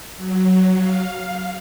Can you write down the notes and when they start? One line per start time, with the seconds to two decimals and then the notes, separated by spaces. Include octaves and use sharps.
0.17 F#3
0.77 F5